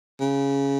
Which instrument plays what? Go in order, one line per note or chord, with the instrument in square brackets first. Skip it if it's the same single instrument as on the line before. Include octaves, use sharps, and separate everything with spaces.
[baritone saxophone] C#3